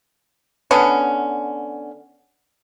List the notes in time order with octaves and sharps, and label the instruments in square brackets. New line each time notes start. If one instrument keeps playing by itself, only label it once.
[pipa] D3 B3 C#4